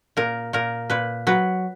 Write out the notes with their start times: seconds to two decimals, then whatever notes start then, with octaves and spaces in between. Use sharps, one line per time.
0.17 A#2 A#4
0.53 A#2 A#4
0.90 A#2 B4
1.27 F#3 B4